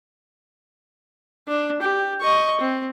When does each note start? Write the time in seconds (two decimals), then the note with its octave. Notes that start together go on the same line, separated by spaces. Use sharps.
1.48 D4
1.82 G4
2.21 D#5 C#6
2.61 C4